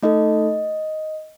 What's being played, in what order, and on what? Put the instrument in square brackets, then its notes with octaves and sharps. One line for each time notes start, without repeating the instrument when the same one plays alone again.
[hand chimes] A3 D#4 A4 D#5